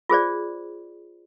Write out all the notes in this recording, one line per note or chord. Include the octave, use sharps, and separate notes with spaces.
F4 G#4 C5 D5